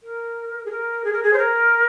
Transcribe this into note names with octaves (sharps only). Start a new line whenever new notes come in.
A#4
G#4
A#4
G#4
A#4
G#4
C5
A#4